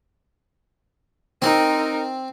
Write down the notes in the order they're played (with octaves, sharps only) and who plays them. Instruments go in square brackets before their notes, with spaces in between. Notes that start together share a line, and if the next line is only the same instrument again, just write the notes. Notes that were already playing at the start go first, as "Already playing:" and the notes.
[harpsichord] C4 [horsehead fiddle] D#4 A#4